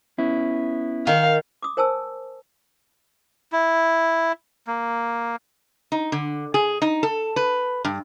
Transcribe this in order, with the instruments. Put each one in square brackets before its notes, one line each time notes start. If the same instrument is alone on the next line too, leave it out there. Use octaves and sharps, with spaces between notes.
[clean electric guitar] B3 C#4 E4
[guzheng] D#3 [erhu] F5
[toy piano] D6 D#6
A#4 C5 G#5 A5 E6
[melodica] E4
A#3
[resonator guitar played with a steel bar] D#4
D3
G#4
D#4
A4
B4
G2